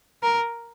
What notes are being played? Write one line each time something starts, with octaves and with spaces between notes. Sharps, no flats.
A#4